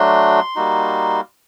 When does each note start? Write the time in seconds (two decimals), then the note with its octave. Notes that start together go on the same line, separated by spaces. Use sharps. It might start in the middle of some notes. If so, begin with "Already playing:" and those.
Already playing: F#3 A3 D4 F#4 C6
0.56 G3 A#3 D#4 F#4